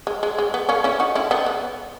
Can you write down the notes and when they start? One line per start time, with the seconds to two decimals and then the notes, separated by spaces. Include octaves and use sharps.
0.07 G#3
0.23 G#3
0.38 G#3
0.54 B3
0.69 A#3 C#4
0.84 C#4 E4
1.00 D#4 F#4
1.15 C#4 E4
1.31 B3 D#4
1.46 B3